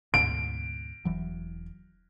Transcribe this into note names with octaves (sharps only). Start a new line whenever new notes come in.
D2 G#2 B2 D7
E1 E3 F#3